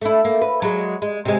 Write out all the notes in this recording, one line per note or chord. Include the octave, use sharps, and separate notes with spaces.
A3 E4
A#3
B4
F#3 G#3
G#3
C3 G#3